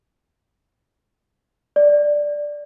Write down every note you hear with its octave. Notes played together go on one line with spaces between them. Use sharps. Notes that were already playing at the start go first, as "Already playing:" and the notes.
D5